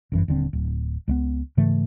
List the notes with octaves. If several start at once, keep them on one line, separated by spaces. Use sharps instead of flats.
G1 F#2 E3
D#1 D3 C4
D1
C#2 G#3 B3
G#2 C#3 E3 A3